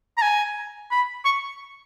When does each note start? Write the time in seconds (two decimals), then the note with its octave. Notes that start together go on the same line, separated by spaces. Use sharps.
0.18 A#5
0.22 G#5
0.91 B5
1.25 C#6